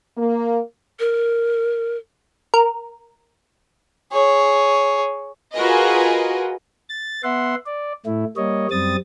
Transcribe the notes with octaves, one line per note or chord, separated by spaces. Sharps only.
A#3
A#4
A#4
G#4 C#5
F4 F#4 G#4 A#4 B4 D#5
A6
B3 E5 F#5 C6
D5
A2 A3 E4
G3 A#3 C#5 D#5
F#2 G3 C4 D#6 A6